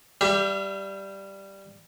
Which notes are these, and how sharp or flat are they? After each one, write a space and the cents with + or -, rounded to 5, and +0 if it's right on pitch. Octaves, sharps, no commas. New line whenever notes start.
G3 +0 G4 +0 E5 +45